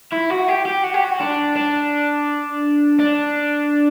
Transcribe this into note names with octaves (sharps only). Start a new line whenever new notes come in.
E4
F#4
G4
G4
F#4
G4
F#4
D4
D4
D4